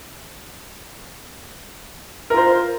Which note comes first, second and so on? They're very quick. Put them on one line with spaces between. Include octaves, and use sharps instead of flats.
A#4 F4 C5